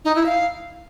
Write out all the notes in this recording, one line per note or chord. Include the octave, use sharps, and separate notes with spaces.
D#4
E4
F5